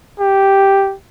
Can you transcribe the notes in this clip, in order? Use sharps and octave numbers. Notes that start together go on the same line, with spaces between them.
G4